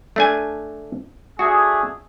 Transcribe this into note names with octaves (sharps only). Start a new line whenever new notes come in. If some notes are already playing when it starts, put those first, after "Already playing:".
A3 D4 G#5
A3 D4 F#4 G#4